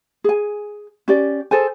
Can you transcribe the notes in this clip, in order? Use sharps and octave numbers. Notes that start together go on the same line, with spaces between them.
G#4 G#5
C#4 G4 D5
G#4 A4 C5 G#5